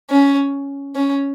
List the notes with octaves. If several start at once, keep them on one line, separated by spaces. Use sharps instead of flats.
C#4
C#4